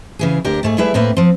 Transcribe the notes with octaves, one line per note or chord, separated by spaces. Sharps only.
C#3 E3 G#4
D2 D4 G4 A#4
G#2 A3 G#4
G3 A3 E4 G#4 B4 E5
A2 A3 A#3 C4 B4 E5
F3 C4